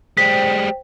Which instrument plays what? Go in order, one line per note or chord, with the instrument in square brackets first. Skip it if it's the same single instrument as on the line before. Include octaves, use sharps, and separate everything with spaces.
[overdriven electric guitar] G3 G#3 [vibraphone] C5 G5 [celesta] B6